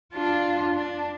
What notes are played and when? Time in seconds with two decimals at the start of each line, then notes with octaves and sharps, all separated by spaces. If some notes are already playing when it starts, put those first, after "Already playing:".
0.13 D4 F4
0.75 D4